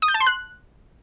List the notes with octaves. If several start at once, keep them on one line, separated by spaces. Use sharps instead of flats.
D#6
G6
A5
C6
F#6